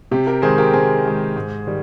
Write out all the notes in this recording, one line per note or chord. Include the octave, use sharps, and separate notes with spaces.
C3 G4
G4 A#4
D#3 G#3 G#4 C5
G4 A#4
C3 G#4 C5
D#3 G#3
G#2
D#3 G3